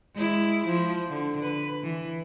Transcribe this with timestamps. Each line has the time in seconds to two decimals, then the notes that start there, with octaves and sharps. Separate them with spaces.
0.15 G#3 E4
0.67 F3
1.09 D3
1.42 B4
1.83 E3